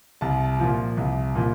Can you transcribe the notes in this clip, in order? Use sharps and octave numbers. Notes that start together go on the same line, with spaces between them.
C2 A5
A#2 F3
C2
A#2 F3